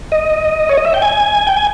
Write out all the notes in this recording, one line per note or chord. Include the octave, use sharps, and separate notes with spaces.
D#5
C#5
D#5
E5
G5
G#5
G5
G#5